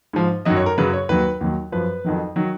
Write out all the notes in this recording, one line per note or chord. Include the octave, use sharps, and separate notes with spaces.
G#2 F3
F#2 D#3 F#3 D#5
C#5
A#4
F#2 C#3 F#3 B4
C#5
D#2 D#3 F#3 B4
D#2 D#3 F#3
F#2 F3 B4
F2 D#3 F#3
D#3 F#3